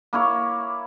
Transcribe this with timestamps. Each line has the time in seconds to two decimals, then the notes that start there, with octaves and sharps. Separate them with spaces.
0.13 A#3 E4 C#5